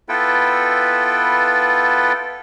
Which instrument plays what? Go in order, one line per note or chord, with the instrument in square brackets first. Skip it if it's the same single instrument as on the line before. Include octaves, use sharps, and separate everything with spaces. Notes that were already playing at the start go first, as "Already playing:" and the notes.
[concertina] B3 E4 F4 A4 B4 G5